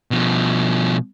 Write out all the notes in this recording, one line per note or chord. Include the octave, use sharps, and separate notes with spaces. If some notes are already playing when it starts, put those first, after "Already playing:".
B2 F3